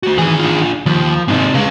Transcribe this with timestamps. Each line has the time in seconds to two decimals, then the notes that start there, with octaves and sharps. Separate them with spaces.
0.03 A3 F#4
0.18 D#3 E3 G#4
0.39 D4 F4
0.86 D#2 F3
1.28 G#2 C3 C4 D#4
1.54 C#3 G#3 B4 F5